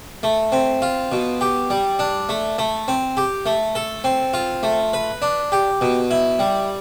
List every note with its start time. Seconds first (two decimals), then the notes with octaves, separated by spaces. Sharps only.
0.23 A3
0.52 C4
0.82 F4
1.12 B2
1.41 G4
1.70 G3
1.99 D4
2.29 A3
2.58 A3
2.88 C4
3.17 G4
3.46 A3
3.75 A4
4.04 C4
4.33 F4
4.63 A3
4.93 B4
5.22 D4
5.52 G4
5.81 B2
6.11 E4
6.39 G3